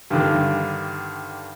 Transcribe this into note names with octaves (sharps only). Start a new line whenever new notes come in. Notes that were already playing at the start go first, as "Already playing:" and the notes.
G2 D3 D#3